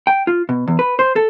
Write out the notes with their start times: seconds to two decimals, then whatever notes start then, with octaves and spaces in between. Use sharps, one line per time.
0.07 G5
0.27 F4
0.49 B2
0.68 E2
0.79 B4
0.99 C5
1.16 A4